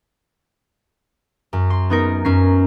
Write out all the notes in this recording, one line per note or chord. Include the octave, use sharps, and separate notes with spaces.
F#2
C6
B3 D#4 A#4
F#2 C#4 C7